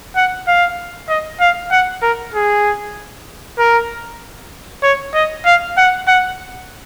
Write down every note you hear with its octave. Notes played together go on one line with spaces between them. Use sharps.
F#5
F5
D#5
F5
F#5
A#4
G#4
A#4
C#5
D#5
F5
F#5
F#5